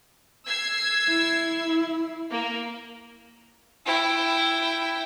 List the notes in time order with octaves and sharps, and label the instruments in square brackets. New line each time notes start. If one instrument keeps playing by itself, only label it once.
[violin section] E6 G#6 C7
[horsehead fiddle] E4
[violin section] A#3
[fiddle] E4 G5